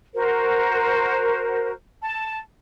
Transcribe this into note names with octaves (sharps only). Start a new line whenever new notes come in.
F#4 A#4 C5
A5